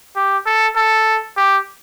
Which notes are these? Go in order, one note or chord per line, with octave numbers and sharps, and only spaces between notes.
G4
A4
A4
G4